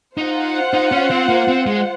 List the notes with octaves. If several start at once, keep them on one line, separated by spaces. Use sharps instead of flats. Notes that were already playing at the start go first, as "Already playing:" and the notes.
D#4 F4 C5 F#5
D#4
C#4
C4
A#3
C4
G#3